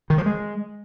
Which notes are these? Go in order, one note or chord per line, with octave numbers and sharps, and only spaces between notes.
D#3
F3
G#3